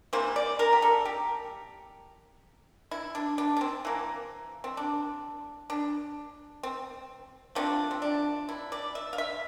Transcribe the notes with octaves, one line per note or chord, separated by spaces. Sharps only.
C3 E3 A#3 C5
D5
A#4
G4
A4
G4
E4
D4
D4
D4
C4
E3 A#3
C4
D4
D4
C4
F3 A3 C4 D4
C4
D4
E4
D5
E5
F5
E5